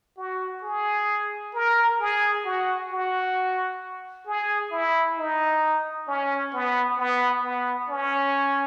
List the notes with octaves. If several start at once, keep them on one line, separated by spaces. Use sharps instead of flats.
F#4
G#4
A#4
G#4
F#4
F#4
G#4
E4
D#4
C#4
B3
B3
B3
C#4